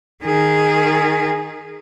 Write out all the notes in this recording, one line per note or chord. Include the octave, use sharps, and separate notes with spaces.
D#3 G#4